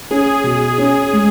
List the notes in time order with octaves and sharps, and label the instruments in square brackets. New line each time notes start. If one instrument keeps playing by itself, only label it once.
[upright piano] C#4 [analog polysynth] G#4
[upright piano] B2
C#4
G#3